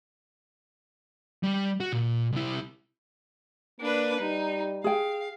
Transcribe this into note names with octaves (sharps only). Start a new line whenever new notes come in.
G3
F#4
A#2
C2 E4
A#3 D4 B4
G3 D#4
G#4 F5 G5